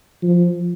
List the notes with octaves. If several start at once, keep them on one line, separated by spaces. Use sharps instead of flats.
F3